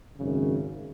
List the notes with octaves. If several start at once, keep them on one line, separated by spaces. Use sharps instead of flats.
G#1 F#2 C#3